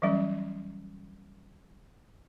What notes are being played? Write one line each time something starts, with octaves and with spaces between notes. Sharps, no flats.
E3 F#3 G3 C#4